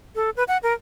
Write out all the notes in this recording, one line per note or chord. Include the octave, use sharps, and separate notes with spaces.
A4
B4
F#5
A#4